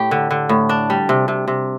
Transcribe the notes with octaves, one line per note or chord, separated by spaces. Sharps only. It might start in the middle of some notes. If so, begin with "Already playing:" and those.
Already playing: A2 G4
D3
D3
A2
D4
G3
C3
C3
C3